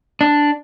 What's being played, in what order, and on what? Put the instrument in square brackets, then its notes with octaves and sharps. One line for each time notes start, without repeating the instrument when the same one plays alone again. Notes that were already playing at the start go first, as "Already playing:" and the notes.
[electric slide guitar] D4